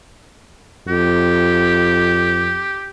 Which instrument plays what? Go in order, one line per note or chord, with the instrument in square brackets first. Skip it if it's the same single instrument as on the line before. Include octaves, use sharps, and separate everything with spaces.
[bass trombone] F2 [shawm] G4